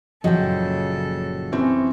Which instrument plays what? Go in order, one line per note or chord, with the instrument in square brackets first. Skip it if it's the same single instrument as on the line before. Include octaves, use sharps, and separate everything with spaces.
[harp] F#1 F3 G5 [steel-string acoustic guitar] A#2 F#3 [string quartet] C#3 A4 [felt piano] D#5
[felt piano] E3 C4 C#4 [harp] C#6